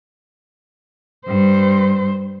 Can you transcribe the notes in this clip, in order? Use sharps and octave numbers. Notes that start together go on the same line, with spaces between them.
G2 C5